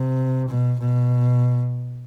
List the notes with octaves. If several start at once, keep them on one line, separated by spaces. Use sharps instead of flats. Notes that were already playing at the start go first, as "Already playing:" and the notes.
Already playing: C3
B2
B2